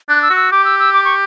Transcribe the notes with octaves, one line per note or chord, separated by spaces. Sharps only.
D4 F#6
E6
F#4
E6
G4 D6
E6
E6
D6
C#6